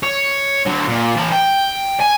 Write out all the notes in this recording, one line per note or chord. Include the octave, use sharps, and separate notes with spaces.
C#5
D3 F#3
A#2
E3 A5
G5
G#5